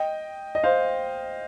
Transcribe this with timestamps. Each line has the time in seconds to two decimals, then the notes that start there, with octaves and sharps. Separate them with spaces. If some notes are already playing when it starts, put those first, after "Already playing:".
Already playing: D#5 G5
0.55 D#5
0.64 C5 F5